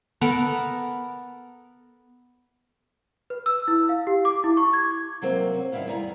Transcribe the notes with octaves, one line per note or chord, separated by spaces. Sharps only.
B3 A4 A#4
B4
E6
E4
F5
G4
D6
E4
C#6
G#6
C3 F#3 A#3 C4
C#4
G2 D#3 E3 B3 E4 F5
E2 G3 B3 G#5 A#5